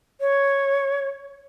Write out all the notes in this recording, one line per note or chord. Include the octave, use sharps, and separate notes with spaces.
C#5